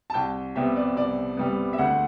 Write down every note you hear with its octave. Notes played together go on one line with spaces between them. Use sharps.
A5
C2 G5
C3 G3 B3 E5
D5
C2 D5
C3 G3 B3
E5
D2 F#5